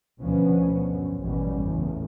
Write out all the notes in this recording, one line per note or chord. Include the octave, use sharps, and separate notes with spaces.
D2 B2 F3 B3 C#4
F#2
A1 F#2 B2 G3 C#4
E2 A2 C#3